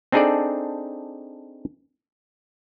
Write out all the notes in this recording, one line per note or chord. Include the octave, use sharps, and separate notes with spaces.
C4 D4 D#4 G#4 A4 D5